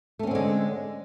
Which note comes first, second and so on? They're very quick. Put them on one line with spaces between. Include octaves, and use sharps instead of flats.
A3 C#4 C4 D3 G#3